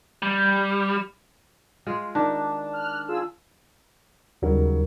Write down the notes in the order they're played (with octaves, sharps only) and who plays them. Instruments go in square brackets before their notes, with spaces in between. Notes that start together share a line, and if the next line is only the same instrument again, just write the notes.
[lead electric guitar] G3
[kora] G#3 F4 G#4
[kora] D#3 [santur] D4
[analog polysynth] F6 F#6
F4 G#4 E6
[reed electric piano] D#2 D#4 A#4 [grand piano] C#3 F#3 G3